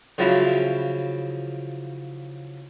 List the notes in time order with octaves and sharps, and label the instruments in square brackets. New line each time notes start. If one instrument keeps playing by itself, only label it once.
[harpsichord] C#3 F3 F#3 E4